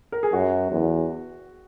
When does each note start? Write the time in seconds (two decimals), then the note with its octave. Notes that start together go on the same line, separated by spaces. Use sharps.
0.12 A#4
0.23 G#4
0.33 F#2 F#4
0.71 E2